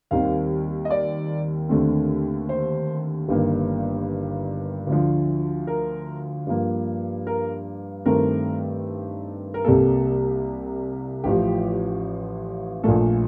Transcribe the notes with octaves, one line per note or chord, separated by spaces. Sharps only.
D#2 D#3 G3 C4 F5
D#5
D5
D#2 D3 A3 C4
C5
G1 G2 D#3 A#3
D2 D3 F3
A#4
G2 F3 A#3
A#4
G2 D#3 A3 C4 A#4
A#4
C2 C3 G3 A#3 A4
A1 A2 F3 G4
A#1 A#2 A3 A4